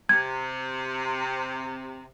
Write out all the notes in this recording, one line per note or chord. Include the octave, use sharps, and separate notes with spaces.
C3 G#6